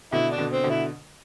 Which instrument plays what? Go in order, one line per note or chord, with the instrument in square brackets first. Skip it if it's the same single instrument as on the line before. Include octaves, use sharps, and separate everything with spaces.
[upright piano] B2 D3 [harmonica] E4
[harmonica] D4
[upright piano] B2 D3
[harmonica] C4
[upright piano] B2 D3
[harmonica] E4